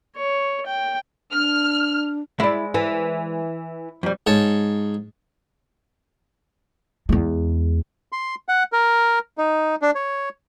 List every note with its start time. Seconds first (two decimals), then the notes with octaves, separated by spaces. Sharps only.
0.17 C#5
0.66 G5
1.32 D4 F6
2.40 G#3 E4 D5
2.74 E3
4.03 F2 G3
4.27 G#2 C#5 A5
7.09 E2 G#3
8.12 C6
8.49 F#5
8.73 A#4
9.38 D#4
9.82 D4
9.95 C#5